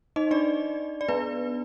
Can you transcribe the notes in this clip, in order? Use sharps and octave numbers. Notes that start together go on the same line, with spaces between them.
D#4 D#5
D4 D5
D5
B3 B4